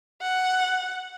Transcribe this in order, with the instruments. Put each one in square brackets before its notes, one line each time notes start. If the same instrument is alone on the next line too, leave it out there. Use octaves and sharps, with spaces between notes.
[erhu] F#5